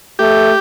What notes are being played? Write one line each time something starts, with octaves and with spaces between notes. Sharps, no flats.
A3 G4